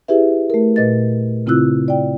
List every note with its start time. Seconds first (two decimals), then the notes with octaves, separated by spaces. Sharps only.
0.08 E4 G4 G#4 B4 E5
0.50 A3 A#4
0.76 A#2 B4 D#5 A6
1.46 C#3 C4 E4 F4 E6 F#6
1.88 D5 G5